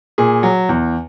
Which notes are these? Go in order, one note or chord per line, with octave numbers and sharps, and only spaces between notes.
A#2 G#4
F#3
E2